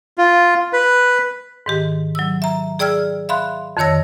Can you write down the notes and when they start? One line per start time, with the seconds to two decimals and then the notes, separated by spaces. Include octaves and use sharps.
0.18 F4
0.73 B4
1.66 G#2 D#3 G4
2.15 F#3 E6
2.42 E5 A#5
2.79 G#4 D5 G5 E6 F6 G#6
3.29 E5 F5 B5 C6 F#6
3.77 F2 D3 D#3 C#5 E6 A#6